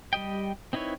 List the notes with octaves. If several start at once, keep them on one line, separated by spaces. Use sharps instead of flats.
G3 G4 D#5 G5
C4 D#4 E4 B4 C#5